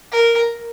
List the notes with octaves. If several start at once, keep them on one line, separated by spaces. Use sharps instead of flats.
A#4